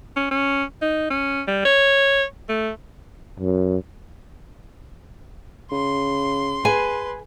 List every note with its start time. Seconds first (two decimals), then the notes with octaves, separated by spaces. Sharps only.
0.16 C#4
0.31 C#4
0.82 D#4
1.10 C#4
1.47 G3
1.65 C#5
2.49 A3
3.40 F#2
5.72 C#3 C6
6.65 G#4 B4 G#5